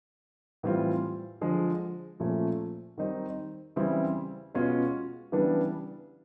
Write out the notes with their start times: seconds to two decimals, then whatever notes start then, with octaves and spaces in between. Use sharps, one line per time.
0.63 A2 E3 G3 C4 F4
1.41 D3 F3 G#3
2.20 A#2 F3 A3 C#4
2.98 D#3 G3 C4 D#4
3.76 C#3 E3 G3 C4 E4
4.55 B2 G#3 C#4 F4
5.32 C#3 E3 G3 B3 D4